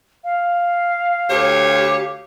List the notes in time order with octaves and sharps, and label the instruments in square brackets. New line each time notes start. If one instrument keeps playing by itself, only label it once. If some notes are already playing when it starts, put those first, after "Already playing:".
[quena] F5
[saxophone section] D2 C#5 [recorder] G4